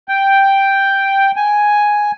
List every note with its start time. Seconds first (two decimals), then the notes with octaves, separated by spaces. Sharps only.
0.09 G5
1.36 G#5